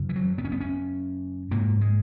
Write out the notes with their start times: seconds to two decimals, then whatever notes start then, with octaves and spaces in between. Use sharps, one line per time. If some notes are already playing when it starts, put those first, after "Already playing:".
Already playing: F#2 C#3
0.09 E3
0.16 F#3
0.38 B3
0.45 C#4
0.52 B3
0.61 C#4
1.51 G#2 A#3
1.81 G#3